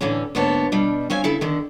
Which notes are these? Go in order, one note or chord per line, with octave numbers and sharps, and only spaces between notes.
A2 D3 E3 C#4
D2 G#2 A#3 B3 C#5 A5
B2 G3 D4
C4 C#4 F5 G#5
C#3 E4 A4
D3 D#3